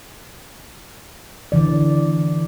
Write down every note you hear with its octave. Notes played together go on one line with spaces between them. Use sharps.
D3 E3 D5